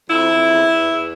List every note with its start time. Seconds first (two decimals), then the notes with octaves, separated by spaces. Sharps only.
0.09 F2 E4
0.28 F2
0.49 E2
0.69 E2
0.89 E2